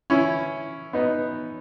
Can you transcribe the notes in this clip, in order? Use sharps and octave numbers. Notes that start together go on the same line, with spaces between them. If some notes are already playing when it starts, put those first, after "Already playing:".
C#4 E4
B3 D#4